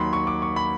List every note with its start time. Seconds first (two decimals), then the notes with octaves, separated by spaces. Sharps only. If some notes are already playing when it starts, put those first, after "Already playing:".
Already playing: D#2 D#3 F#3 B5 C6
0.13 C#6
0.27 D6
0.42 C#6
0.56 B5